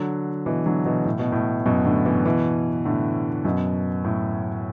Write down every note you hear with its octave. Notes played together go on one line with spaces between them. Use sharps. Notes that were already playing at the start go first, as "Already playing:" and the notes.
Already playing: D3 F#3
B2 E3
D3 F#3
B2 E3
A2
B2
A2
F#2 B2
A2 D3
B2 E3
B2 E3
A2 D3
F#2 B2
A2